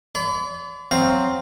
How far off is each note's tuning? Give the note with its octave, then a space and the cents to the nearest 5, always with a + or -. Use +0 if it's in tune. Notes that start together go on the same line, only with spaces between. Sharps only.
D5 -40 B5 +40
F#3 +0 C4 +0 F5 +0